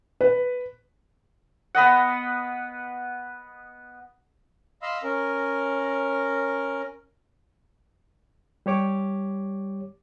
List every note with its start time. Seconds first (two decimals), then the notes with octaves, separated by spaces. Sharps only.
0.21 B4
1.75 B3 B4 D#5 F#5
4.82 D#5 F5 B5 C6 E6
5.03 C#4 A#4
8.66 G3 G4 C#5 D6